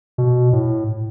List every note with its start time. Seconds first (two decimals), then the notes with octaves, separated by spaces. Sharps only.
0.18 B2
0.53 A2